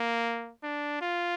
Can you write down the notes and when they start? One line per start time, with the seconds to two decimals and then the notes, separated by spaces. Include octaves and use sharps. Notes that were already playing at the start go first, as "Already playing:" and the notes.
Already playing: A#3
0.63 D4
1.01 F4